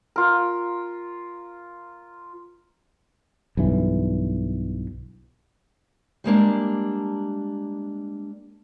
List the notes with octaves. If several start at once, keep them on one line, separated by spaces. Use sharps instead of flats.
F4 A#4
B1 G2 E3
G3 G#3 A#3 D4